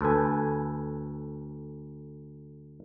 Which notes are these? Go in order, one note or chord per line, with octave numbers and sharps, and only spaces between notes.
D2 A4 B4 G#5